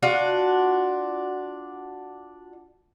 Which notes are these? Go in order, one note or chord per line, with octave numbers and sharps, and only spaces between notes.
D4 F4 F#4